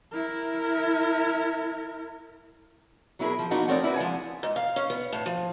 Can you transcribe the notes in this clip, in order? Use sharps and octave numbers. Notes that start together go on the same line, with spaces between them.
E4 A#4
F#3 B3 E4 G4 G#4 A#4
F3
F3 A#3 B3 D#4 F#4
F3 A3 C4 A#4 C#5 D5
A#3 E4 F#4 B4
F3 G#3 F#5 G#5
G#2
F5
C#4
B3
A2
F3